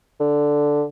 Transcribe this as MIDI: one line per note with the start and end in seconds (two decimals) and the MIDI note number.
0.20 0.84 50